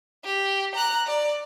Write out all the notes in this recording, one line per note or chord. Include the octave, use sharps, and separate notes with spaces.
G4
A#5 F#6
D5